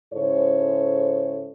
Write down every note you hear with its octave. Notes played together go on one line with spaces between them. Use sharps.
G#2 C#3 E4 A4 C5 C#5